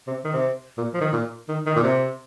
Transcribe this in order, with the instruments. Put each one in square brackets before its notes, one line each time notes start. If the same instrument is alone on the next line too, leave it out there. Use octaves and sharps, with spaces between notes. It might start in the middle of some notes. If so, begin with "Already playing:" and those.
[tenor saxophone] C3
D#3
C3
A#2
F3
D#3
A#2
D#3
D#3
A#2
C3